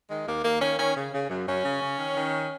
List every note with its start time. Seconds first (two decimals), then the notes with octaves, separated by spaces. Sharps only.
0.10 D#3 G#3
0.27 D#2 A#3
0.45 D#2 A#3
0.62 D#3 C#4
0.79 D#3 C#4
0.97 C#3
1.14 C#3
1.30 F#2
1.48 F#2 C#4
1.65 C#3
1.82 C#3
1.99 D#3
2.16 D#3